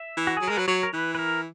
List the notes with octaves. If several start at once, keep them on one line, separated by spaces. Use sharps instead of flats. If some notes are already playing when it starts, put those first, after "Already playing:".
Already playing: E5
E3
F#4
F#3 G#4
G#3 A#4
F#3 B4
F#3 C#5
A#4
E3 B4
B4
A#4